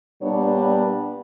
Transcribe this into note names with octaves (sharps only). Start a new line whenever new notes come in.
A#2 G3 B3 D4 C#5